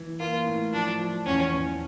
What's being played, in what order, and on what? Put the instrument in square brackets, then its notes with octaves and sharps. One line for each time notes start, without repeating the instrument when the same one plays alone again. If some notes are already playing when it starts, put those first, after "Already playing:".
Already playing: [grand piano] E3
[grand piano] A#3 [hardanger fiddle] F4
[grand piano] A2
[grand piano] F3 [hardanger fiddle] D4
[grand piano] F3
[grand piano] E2 [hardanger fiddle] C#4
[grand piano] E2